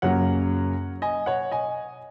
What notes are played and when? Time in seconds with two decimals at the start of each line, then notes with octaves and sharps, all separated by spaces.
0.02 F#2 C#3 F#3 A#3 C#5 F#5
1.02 D#5 G#5
1.26 C#5 F#5
1.51 D#5 G#5